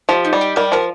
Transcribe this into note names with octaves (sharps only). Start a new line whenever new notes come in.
F3 G4
D#4
G3
G4
G3 A#4
F3 A#4